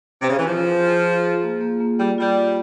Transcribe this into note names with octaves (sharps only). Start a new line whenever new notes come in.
C3
C#3
E3
F3 F4
G#4
G#4
F4
G#4
A#3
A#3
A#3
G3 F4
G3 F4
F4